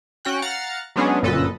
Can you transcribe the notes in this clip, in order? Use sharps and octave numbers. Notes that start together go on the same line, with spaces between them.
C#4 F#4 G5 F#6
F5 F#5 A#5 F6 A6 C#7
F#3 G#3 B3 C#4 D4 G#4
G1 F#2 A#2 A4 B4 D#5